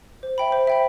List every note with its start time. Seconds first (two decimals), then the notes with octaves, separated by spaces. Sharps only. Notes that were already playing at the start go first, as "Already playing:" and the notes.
0.23 C5
0.38 E5 G5 B5
0.52 C5
0.67 E5 G5 B5